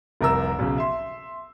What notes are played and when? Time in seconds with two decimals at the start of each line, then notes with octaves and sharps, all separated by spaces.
0.21 F1 C2 A#4 A#5 E6
0.59 B1 C#3
0.78 E5 C6